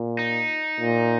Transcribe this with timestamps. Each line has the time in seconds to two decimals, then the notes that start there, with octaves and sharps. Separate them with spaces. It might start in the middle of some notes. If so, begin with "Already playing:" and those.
Already playing: A#2
0.19 D#4
0.80 A#2